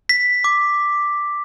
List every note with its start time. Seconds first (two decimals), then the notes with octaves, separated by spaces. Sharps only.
0.09 B6
0.44 D6